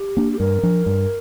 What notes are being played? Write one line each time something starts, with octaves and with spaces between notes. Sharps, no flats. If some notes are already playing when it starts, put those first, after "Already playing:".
Already playing: G4
A#3 D4
G4
G2 A#4
F3 D4
G2